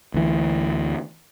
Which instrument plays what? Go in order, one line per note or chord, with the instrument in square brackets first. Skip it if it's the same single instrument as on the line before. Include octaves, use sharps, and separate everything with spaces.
[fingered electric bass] D2 E3